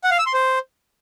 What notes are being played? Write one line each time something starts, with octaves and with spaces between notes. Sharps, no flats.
F#5
F5
E6
C6
C5